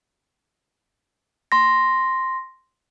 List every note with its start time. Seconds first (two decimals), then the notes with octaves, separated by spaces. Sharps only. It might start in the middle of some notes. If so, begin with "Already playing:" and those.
1.52 C6 A#6